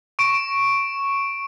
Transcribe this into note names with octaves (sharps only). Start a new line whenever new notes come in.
C#6 D7 E7